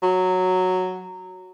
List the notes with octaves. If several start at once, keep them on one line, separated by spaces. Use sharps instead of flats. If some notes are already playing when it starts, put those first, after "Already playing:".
F#3